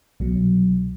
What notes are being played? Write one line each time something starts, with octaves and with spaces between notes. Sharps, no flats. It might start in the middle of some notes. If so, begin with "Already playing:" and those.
C2 B2 F#3